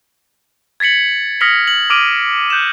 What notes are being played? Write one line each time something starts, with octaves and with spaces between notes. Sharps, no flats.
G#6 A6 B6 C#7 F#7
D#6 F6 A#6 B6 C#7 F#7
F#7
D6 D#6 F6 D7 D#7
F#6 G6 C#7 E7